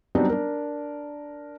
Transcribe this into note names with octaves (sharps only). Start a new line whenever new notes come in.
F#3 G3 B3 C4 D4 D#4
D4 A#4